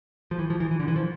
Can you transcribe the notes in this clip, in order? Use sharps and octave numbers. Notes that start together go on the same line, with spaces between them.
F3
E3
F3
E3
E3
D3
E3
F3